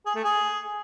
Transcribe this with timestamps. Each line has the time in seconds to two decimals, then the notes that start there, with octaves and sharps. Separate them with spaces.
0.06 G#4
0.15 A3
0.24 G#4